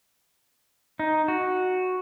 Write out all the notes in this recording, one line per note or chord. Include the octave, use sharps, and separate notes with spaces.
D#4
F#4